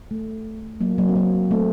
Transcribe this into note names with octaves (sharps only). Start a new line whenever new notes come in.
A3
F#3 A#3
F#3 A#3
C4
F#3 A#3
A3 C4